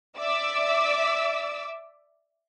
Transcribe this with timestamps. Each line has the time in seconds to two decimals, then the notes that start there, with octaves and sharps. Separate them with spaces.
0.18 D5 E5 D6 E6